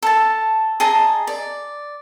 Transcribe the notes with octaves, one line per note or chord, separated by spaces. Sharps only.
A4 A5
G#4 D#5 A5 A#5
D5